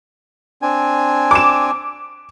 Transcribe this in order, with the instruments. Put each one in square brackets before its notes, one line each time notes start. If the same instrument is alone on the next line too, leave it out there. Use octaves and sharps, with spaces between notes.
[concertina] C4 D4 G#5
[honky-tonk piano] D6 E7